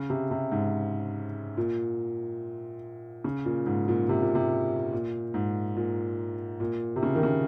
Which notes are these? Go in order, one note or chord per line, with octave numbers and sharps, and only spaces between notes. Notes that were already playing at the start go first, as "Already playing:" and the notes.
Already playing: C#3
C3
C3
G#2
A#2
C#3
A#2
G#2
A#2
C3
A#2
C3
A#2
G#2
A#2
A#2
C3
C#3
D#3
C#3